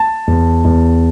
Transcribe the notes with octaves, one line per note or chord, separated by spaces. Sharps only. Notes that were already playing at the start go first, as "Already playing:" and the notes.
Already playing: A5
E2
E2